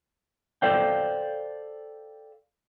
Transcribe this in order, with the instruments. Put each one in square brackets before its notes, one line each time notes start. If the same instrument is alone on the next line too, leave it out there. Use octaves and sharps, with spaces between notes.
[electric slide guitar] A4 C5 D5 F5 G5